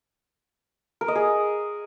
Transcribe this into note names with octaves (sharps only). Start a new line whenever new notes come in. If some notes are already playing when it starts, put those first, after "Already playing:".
A#4
D#5
G#4